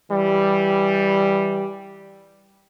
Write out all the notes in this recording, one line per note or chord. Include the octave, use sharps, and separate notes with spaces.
E3 G3